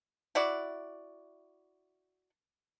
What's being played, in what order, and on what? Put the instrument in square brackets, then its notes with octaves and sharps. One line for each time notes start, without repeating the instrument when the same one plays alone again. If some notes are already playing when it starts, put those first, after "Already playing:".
[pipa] E4 F#4 D5